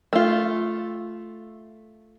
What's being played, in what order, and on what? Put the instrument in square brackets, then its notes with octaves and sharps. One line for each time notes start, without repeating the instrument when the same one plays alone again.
[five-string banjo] A3 F4